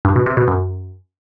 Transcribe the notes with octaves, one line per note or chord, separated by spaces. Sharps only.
G2
B2
C3
B2
F#2